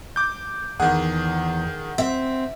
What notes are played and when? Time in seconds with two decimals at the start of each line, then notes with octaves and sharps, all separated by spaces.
0.16 D6 G6
0.80 E2 D#3 G#4 F#5
1.98 C4 E5